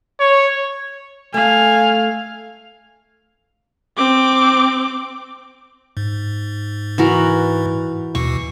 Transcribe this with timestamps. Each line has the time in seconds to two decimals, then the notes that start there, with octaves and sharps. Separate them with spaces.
0.20 C#5
1.34 A3 F5 G#5
3.98 C4 D6
5.97 G#2
6.98 E3 F#4 A#4
8.15 D#2 B2 C#6